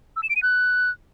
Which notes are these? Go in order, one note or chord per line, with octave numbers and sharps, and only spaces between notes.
E6
E7
D7
D#7
F#6